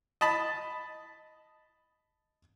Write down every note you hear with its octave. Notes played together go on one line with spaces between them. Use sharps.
D#5 A5 B5